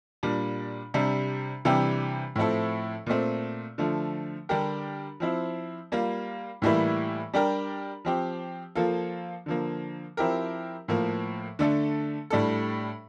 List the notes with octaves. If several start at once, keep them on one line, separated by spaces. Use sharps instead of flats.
A#2 G3 D4
C3 G3 D4
C3 E3 G3 D4 G4
A2 F3 C4 E4 A4
A#2 A3 C4
D3 F3 A3
D3 G3 D4 G4 A#4
F3 C4 E4
G3 A#3 F4
A2 E3 G3 A#3 E4
G3 D4 G4 A#4
F3 C4 G4
F3 A#3 F4 A4
D3 F3 A#3
F3 C4 E4 G4 A#4
A2 F3 A#3
D3 A3 D4 A4
A2 G3 D4 A4